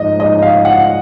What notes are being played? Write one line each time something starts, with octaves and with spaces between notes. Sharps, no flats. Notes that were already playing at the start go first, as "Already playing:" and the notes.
Already playing: G#2 F3 D#5
D#5
F5
F#5